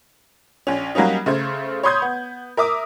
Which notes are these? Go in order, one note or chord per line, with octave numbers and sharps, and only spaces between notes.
A#1 C#4
F#3 G3 A#3 C#4 D#4
C#3 A3 C5 G#6
C#5 B5 C6 D#6 G6 G#6
B3
A#4 E5 D6 D#6